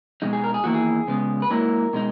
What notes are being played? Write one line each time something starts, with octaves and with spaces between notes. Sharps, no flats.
B2 G#3 D#4
G#4
A#4
G#4
E2 D#3 A#3 E4 F#4
G#4
C#3 G#3 B3
B4
G#2 F#3 A#3 E4 A#4
B2 G#3 D#4